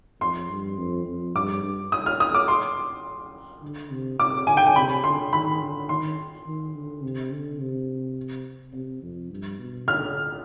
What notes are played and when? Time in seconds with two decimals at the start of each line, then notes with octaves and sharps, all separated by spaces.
0.21 F2 C6
0.50 G2
0.78 F2
1.06 F2
1.35 G2 D6
1.63 G2
1.92 D#6
2.06 F6
2.20 D#6
2.34 D6
2.48 C6
3.63 D3
3.91 C3
4.19 C3 D6
4.47 D3 G#5
4.57 G5
4.67 G#5
4.76 C3 B5
5.04 D3 C6
5.33 D#3 B5
5.61 D3
5.89 D#3 C6
6.46 D#3
6.75 D3
7.03 C3
7.32 D3
7.60 C3
8.73 C3
9.02 F2
9.31 G2
9.59 B2
9.87 D3 F6